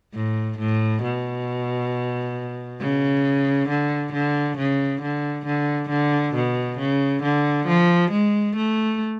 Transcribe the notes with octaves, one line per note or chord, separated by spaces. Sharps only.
A2
A2
B2
C#3
D3
D3
C#3
D3
D3
D3
B2
C#3
D3
F3
G#3
A3